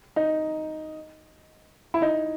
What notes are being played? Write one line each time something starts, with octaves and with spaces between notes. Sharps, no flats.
D#4
E4
D#4